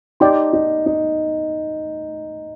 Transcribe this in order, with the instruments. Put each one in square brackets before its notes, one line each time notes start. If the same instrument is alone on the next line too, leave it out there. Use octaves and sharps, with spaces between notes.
[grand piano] D#4 [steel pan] G4 D5 G5 C6
[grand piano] D#4
D#4